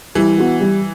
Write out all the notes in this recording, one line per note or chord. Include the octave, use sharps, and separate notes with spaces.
E3 G3
B3 F#4
G3